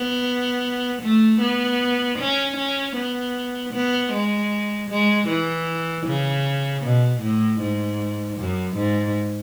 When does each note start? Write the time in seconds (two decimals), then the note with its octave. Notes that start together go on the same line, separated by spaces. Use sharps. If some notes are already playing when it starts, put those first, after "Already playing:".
Already playing: B3
1.02 A3
1.41 B3
2.18 C#4
2.56 C#4
2.96 B3
3.73 B3
4.12 G#3
4.90 G#3
5.28 E3
6.06 C#3
6.83 B2
7.21 A2
7.60 G#2
8.37 F#2
8.76 G#2